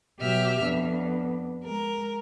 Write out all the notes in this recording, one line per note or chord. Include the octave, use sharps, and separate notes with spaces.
B2 F#3 G4 E5 F6
F2 B3 D4
G#3 A#4